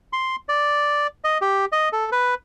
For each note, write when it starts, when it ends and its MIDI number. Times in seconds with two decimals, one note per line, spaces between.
0.13 0.36 84
0.49 1.07 74
1.24 1.38 75
1.41 1.65 67
1.72 1.89 75
1.93 2.10 69
2.12 2.34 71